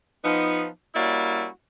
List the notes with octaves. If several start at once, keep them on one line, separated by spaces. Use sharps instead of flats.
F3 B3 D#4
G3 A#3 C#4 E4 F#4 D5